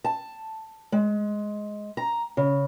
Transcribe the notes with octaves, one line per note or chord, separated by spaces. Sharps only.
A5
G#3
A#5
C#3